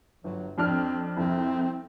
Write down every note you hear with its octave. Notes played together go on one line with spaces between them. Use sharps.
G1 F#3
F2 C4 D4 F6
C2 F2 C4